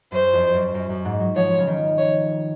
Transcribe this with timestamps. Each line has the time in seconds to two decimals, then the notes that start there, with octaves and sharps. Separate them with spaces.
0.12 F#2 C5
0.33 F2
0.54 F#2
0.74 F#2
0.89 F#2
1.05 G#2
1.20 F#3
1.36 F3 C#5
1.58 C#3
1.67 D#3
1.98 C#5